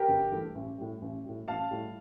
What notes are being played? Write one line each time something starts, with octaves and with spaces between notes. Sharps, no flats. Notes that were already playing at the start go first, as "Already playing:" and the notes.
Already playing: G4 A#4
G1
G2 E3 A3
A1
A2 G3
A1
A2 G3
A1 F5 A5
A2 G3